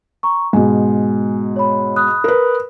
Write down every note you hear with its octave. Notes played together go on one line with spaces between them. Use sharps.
A#5 C#6
G#2 B2 G#5
C#5 B5
B5 D#6 F#6
A#4 B4